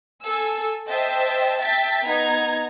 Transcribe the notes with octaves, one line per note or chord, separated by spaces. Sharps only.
A4 G#5 E6
C5 D#5 E5 G5 A5
E5 G5 A5 A6 B6
B3 D#4 A#5 G#6